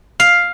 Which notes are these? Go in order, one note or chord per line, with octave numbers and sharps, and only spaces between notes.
F5